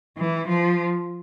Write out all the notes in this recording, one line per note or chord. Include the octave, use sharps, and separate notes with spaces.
E3
F3